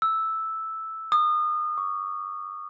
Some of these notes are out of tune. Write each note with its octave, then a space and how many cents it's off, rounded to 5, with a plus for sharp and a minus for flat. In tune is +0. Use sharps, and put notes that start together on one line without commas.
E6 -5
D#6 -30
C#6 +30